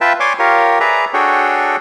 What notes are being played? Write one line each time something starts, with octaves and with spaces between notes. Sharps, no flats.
F4 B4 E5 G5 A5
C#5 D5 G#5 C6 D6
F4 G4 A#4 C#5
G#4 B4 D5 E5 A#5
D4 F#4 G#4 A4 C#5 G5